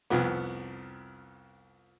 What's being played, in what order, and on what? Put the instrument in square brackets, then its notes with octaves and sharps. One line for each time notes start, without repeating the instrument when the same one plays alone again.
[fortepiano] C2 F2 F3 B3